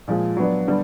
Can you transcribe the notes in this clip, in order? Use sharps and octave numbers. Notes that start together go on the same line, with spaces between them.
A#2 F3 G#3
F#3 B3 D4
D3 G3 B3